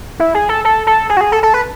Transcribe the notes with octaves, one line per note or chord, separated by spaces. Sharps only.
E4
G#4
A4
A4
A4
G#4
F#4
G#4
A4
A4
B4